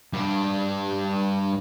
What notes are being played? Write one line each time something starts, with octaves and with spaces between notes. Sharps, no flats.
G2 D4